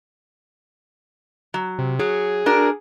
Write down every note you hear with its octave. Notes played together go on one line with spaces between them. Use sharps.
F#3
C3
F#3 G#4
D4 F#4 A#4